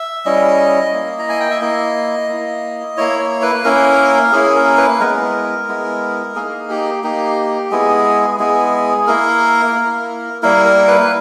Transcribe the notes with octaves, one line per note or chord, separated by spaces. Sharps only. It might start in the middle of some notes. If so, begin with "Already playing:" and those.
Already playing: E5
G3 C#4 E4 D#5
A#3 E4
A#5
G#5
G5
E5
A#3 E4 D#5
A#3 E4
A#3 E4 C#5
C#5
B4
A#3 C#4 E4 A#4
A#3 C#4 E4 G#4
A#4
B4
G#3 B3 E4 A#4
G#3 B3 E4
A#3 D#4 G#4
G4
A#3 D#4 G4
G#3 B3 E4 G#4
G#3 B3 E4 G#4
A#3 E4 A#4
A#3 E4
G3 A#3 E4 A#4
A#4
B4